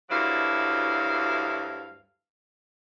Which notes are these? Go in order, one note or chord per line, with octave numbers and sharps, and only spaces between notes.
D2 G2 F#3 E4 F5